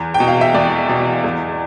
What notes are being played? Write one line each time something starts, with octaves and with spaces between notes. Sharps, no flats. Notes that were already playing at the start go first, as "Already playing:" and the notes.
Already playing: E2
G5
B2
F5
E5
E2 D5
B2
E2